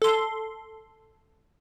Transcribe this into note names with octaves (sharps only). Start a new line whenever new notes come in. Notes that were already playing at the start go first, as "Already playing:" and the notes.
A4 C6